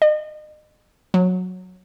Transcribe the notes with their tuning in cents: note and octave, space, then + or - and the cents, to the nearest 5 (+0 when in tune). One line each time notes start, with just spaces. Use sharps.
D#5 -40
F#3 -15